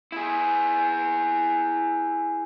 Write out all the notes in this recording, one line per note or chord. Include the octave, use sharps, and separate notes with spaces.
E4 G#4